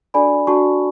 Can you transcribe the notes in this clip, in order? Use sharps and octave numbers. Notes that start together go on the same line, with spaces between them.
D4 F#4 A4 D5 G#5 B5
D4 F#4 A4 D5 A5 C#6